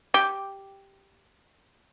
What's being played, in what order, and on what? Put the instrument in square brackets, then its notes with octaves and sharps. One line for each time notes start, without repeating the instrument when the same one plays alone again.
[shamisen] G4 [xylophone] D6